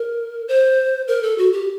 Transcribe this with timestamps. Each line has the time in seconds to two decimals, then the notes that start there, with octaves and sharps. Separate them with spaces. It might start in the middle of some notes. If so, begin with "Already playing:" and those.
Already playing: A#4
0.48 C5
1.08 A#4
1.23 A4
1.38 F#4
1.52 G4